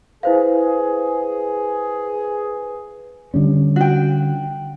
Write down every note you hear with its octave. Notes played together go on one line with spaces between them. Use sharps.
E4 G#4 B4 C5 F5
D3 G3 C#4
F#4 G5